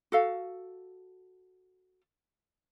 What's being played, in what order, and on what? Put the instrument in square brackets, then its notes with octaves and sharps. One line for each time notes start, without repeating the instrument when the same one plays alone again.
[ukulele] F#4 A4 F5